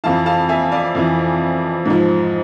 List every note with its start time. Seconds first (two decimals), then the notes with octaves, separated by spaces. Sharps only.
0.04 F2 E3 F5 A5
0.26 F5 A5
0.49 E5 G#5
0.72 D5 F5
0.95 F2 E3
1.85 G#2 F3